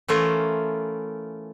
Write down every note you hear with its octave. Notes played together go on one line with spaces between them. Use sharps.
E3 A3 C#4 F4 A#4